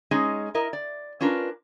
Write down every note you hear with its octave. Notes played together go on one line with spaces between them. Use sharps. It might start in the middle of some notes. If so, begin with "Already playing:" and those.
G#3 C#4 D#4 G#4
E4 A#4 D#5
D5
C#4 D4 F4 A#4 B4